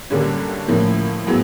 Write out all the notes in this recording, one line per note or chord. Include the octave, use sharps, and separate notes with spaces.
F#2 D3 G3 A#3 C#4
A2 F3 A#3 C#4 E4
A2 F#3 B3 E4 G#4